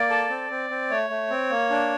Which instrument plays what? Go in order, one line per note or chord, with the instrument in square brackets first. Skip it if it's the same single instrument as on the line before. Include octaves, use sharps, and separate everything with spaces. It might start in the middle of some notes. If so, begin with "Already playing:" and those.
Already playing: [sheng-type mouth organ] A#3 D5
A4
C4
C4
C4
A3 C#5
A3
C4
A#3
D4